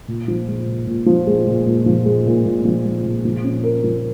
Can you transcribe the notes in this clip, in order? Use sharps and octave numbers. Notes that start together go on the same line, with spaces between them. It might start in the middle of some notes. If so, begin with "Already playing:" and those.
A#2
F3
G#3
A#2
A#2
F3
G#3
A#2
A#2
F3
G#3
A#2
A#2
F3
G#3
A#2
F3
C#4
A#4
F3